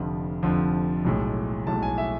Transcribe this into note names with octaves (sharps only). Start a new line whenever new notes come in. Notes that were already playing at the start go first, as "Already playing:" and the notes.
Already playing: F1 F2 D3 F3
F1 F2 D3 F3
B1 A2 G#3
B1 A2 G#3 A5
G#5
E5